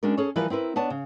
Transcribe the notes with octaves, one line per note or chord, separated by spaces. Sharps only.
G#3 C#4 D4 F#4 A#4
C#4 G#4 A4 C#5
E3 F3 G3 A#4 B4
C4 E4 A#4 B4
B3 D4 C#5 A5
C#3